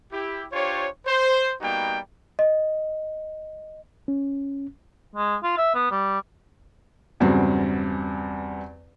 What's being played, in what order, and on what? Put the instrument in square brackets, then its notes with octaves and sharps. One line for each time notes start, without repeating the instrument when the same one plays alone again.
[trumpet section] E4 G4
D4 F4 G4 C5 C#5
C5
G3 A#3 B3 D#4 F#4 G5
[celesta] D#5
[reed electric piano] C#4
[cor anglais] G#3
F4
E5
B3
G3
[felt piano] E2 G2 C#3 F#3 C4